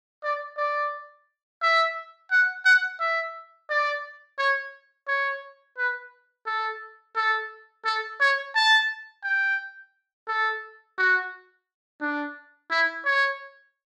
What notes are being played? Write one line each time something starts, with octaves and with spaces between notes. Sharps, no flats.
D5
D5
E5
F#5
F#5
E5
D5
C#5
C#5
B4
A4
A4
A4
C#5
A5
G5
A4
F#4
D4
E4
C#5